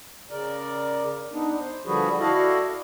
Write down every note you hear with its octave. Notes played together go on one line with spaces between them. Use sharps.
C#3 A#4 D5
B3 D4 D#4
C5
D3 F3 G3 F#4 G#4 B4
E4 F#4 A4 D5 D#5 F5